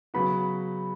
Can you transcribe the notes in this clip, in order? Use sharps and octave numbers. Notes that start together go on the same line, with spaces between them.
C#3 F#3 B3 F#4 B5